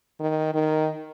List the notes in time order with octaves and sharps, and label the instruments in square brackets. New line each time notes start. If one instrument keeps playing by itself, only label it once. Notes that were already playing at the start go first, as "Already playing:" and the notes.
[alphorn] D#3
D#3